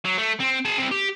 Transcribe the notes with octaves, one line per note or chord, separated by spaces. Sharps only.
F#3
A3
C4
G#4 A5
C4 E4
G4